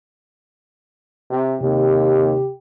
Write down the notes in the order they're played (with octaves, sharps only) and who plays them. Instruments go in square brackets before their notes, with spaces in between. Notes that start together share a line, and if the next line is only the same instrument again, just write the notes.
[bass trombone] C3
[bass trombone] D#2 [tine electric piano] C3 [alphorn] G4